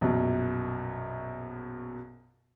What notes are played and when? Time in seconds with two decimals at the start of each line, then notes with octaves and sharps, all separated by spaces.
0.01 A#1 F#2 B2